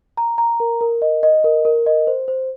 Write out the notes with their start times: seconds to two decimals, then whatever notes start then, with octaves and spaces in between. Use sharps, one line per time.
0.17 A#5
0.38 A#5
0.60 A#4
0.81 A#4
1.02 D#5
1.23 D#5
1.44 A#4
1.65 A#4
1.86 D#5
2.07 C5
2.28 C5